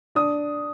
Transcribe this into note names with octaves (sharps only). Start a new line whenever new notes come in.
D4 D#6